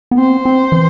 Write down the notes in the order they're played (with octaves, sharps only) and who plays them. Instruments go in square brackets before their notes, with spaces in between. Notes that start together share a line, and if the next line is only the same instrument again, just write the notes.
[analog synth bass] B3
[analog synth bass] C4 [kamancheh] C5
[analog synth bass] C4
E3